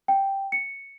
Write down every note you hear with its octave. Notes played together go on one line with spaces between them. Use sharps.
G5
C#7